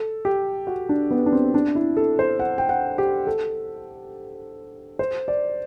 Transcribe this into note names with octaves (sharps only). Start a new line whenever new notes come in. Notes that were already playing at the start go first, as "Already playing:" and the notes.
Already playing: A4
G4
F#4
D4
B3
D4
C4
D4
E4
A4
C5
F#5
G5
F#5
G4
A4
C5
D5